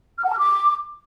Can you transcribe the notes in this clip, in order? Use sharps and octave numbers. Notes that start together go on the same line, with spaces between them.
F6
F#5
A5
F6
D6